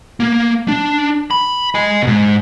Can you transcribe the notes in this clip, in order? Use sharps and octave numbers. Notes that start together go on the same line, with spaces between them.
A#3
D4
B5
D#5 G#5
G#2 B2